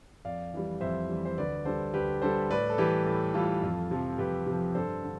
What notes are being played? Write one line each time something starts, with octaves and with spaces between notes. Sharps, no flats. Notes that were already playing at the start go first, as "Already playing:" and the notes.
F2 D5 F5
E3 G3
F2 C5 E5
E3 G3
C5
D2 B4 D5
D3 G3 A4 C5
D2 G4 B4
D3 G3 A4 C5
A2 B4 D5
A4
E3 G3 G4 B4
A2
E3 G3 F4 A4
F2
C3 F3
F2 G4 B4
C3
F3
G2 A4 C5
D3